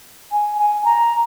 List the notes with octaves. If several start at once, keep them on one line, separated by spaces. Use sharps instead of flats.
G#5
G#5
A#5